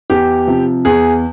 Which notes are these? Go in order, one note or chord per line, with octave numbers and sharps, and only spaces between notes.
E2 G4
C3 F3
E2 G#4